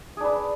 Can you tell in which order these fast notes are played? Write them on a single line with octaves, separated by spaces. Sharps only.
G#4 D4 B4